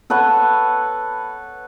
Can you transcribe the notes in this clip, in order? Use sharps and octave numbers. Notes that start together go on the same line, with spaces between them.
A4 B4 C#5 F#5